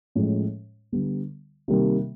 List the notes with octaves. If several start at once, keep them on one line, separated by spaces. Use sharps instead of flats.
A2 F3 G#3 C#4
D3 G3 B3
C3 D#3 G3 A#3